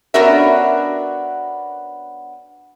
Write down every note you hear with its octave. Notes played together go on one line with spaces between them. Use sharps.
B3 C#4 D4 F#4 A#4 E5